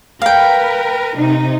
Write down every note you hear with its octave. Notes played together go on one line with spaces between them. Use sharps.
A#4 B4 F5 G5
C3 D#4